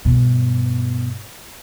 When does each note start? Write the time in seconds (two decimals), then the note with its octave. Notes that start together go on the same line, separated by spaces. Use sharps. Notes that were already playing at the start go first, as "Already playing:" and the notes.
0.05 G2 B2